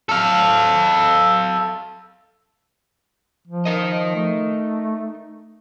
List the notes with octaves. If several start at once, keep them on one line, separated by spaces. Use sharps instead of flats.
A4 F5
F3
D#4 A#4 D#5
A3